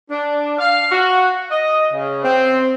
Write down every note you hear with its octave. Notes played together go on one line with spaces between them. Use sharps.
D4
F5
F#4
D#5
C#3
C4